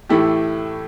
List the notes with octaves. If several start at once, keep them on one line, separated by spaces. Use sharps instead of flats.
A2 E3 A3 E4 G4